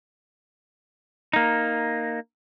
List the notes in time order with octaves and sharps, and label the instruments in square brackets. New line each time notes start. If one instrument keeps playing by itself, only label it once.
[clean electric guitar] A#3 D#4